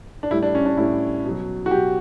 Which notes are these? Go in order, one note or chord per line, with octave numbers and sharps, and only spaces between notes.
D4
A2 G3 E4
D4
C#4
D4
A2 G3 E4
B2 F#3
F#4
B2 F#3 G4